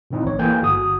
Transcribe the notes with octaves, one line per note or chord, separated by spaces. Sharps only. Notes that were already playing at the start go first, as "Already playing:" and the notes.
A#2 D#3 C4 D#4 E4
A1 C#5
E3 A#3 A4 G5 G#5 G6
G1 F#4 D#6